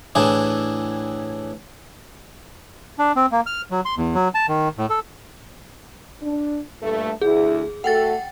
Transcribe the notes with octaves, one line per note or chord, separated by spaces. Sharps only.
A2 E3 D4 G#4
D4
C4
A#3
F6
F#3
C6
E2
F#3
A5
D#3
A2
A4
D4
G2 A#2 A3
D2 E4 G#4
A3 F#4 A4 F#5 G5 A6